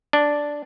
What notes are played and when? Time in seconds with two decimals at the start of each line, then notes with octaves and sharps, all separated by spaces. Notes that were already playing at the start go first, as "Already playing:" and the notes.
0.13 D4